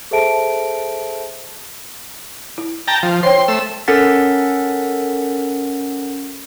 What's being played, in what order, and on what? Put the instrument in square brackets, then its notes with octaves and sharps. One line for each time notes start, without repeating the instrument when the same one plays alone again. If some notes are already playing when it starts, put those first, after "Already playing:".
[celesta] G#4 A4 C5 E5 A5 D7
[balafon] E4
[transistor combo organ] G5 A5 A#5
F3
[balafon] C5 C#5 G5 [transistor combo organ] C6
[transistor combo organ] A3 E6
[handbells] C#4 A4 A#4 F#5 A6 B6